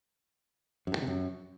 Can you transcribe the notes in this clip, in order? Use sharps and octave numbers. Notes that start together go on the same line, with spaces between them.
F#2
G2
D#3
C3
F#2